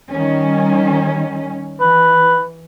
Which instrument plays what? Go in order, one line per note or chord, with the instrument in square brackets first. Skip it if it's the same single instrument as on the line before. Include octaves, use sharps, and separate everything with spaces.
[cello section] D#3 G3 C#4
[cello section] E3 [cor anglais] B4